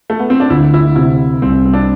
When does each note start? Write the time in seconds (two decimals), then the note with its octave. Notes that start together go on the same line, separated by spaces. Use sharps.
0.10 A3
0.19 B3
0.30 C4
0.40 D4
0.50 D2 E4
0.74 E4
0.96 C3 E4
1.42 C2 C4
1.65 C4
1.73 D4